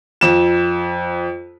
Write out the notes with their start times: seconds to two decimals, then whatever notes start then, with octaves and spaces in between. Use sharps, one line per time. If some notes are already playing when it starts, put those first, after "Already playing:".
0.21 F2 E7